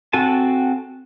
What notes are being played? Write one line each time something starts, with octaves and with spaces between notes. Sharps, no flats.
C4 F#4 A4 G#5 A5